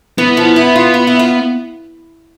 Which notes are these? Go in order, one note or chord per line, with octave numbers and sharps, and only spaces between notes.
E3 B3
F3
E4
F4
F4
E4
F4